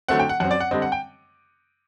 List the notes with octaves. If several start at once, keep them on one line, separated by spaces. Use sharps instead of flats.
D3 F#3 A3 C4 F#5
G5
F#5
F#2 F#3 C4 F#5
D5
F#5
D3 G3 C4 D#5
F#5
G5